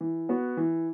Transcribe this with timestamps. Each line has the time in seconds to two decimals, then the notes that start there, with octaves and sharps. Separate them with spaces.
0.01 E3
0.29 B3 F#4
0.57 E3